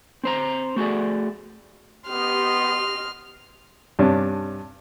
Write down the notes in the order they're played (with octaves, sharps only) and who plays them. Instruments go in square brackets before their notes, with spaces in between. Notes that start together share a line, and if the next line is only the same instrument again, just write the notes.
[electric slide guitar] C4 C5 A#5
A3 F#4 G#4 D5
[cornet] B3 [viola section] G4 D#5 [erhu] C6 [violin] F6
[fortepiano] G2 C3 C#4 D4